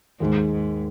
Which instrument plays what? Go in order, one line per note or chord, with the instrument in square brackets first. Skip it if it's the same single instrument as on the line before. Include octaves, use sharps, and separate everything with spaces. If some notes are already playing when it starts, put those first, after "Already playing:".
[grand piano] D#2 D#3 G#3 [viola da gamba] G#2
[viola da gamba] G#2